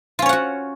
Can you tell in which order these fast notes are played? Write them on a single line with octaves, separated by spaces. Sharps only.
F4 C#4 C#5 F#5 F#4